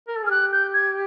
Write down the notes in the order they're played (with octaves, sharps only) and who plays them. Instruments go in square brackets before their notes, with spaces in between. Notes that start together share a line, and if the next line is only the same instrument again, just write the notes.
[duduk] A#4
A4
G#4
[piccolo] F6
[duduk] G4 [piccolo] F#6
[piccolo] G6
G#6